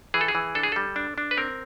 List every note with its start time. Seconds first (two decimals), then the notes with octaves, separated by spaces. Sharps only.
0.14 E3 G#4
0.21 A4
0.28 G#4
0.35 E3
0.55 D4 A4
0.63 G#4
0.72 G3 A4
0.96 D4
1.18 D4
1.31 B4
1.37 C4 A#4